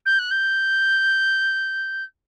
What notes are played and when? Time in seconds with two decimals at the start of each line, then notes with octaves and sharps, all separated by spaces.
0.06 G6
0.19 F#6
0.31 G6